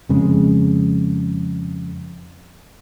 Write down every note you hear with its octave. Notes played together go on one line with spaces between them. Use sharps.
F2 C#3 G#3